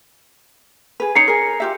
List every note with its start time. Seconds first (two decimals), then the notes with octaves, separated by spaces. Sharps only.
1.00 G#4 B4
1.15 D#4 C#5 A#5 C7 C#7
1.28 G#4 A#4
1.60 F4 G4 E5